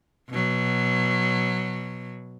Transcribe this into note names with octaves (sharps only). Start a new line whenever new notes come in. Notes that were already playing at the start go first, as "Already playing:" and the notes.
B2 F#3